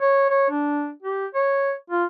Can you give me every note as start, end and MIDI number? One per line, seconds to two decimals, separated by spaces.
0.01 0.25 73
0.30 0.50 73
0.50 0.91 62
1.03 1.26 67
1.35 1.73 73
1.90 2.05 65